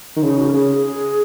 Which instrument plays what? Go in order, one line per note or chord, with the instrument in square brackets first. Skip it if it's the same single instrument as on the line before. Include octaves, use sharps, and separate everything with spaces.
[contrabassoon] D#3
[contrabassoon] C#3 [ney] D#4
[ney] F#4
A#4
[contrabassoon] C#3 [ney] G#4